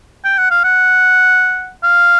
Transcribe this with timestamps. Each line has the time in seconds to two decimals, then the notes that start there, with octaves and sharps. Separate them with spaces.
0.24 G5
0.38 F#5
0.50 F5
0.64 F#5
1.83 F5